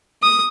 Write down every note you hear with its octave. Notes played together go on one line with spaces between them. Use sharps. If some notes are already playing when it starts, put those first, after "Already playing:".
D#6